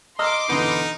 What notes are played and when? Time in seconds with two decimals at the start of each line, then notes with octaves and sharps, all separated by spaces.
0.19 D#5 A#5 C6 D6 E6 F6
0.49 B2 D3 E3 B3 D#4